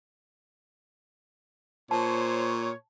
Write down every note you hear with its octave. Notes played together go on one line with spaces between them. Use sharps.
A#2 C5 C#5 A5